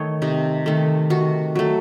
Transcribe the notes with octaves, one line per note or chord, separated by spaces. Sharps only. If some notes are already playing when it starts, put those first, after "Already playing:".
Already playing: D#3 A3 C#5 D#5
C3 D#4
D#3 A3
D#3 F#4
F#3 A3